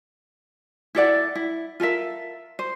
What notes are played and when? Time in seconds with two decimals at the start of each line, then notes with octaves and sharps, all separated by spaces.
0.95 E4 A4 D5 F#5
1.35 E4
1.80 F4 A4 A#4 E5
2.59 C5